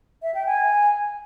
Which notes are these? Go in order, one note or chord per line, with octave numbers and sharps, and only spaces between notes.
E5
G5
G#5